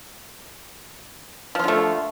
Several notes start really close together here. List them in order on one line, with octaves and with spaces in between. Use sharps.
F3 F4 D3 A3